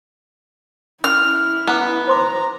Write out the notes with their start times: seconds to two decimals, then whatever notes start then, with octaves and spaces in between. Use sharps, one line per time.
1.04 C#4 E4 F6
1.67 B3 B4 A#5 D6
2.07 C5 A#5 C6 D6